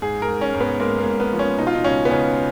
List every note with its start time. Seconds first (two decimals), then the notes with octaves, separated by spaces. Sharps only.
0.02 G#2 G#4
0.22 A#4
0.29 G#2
0.41 C#4
0.54 G#2
0.60 B3
0.80 G#3 A#3
1.01 A#3
1.06 G#2
1.20 B3
1.33 F3
1.39 C#4
1.59 B2 D#4
1.67 F4
1.75 D#4
1.84 C#2 C#4
2.05 B3
2.11 C#2 C#4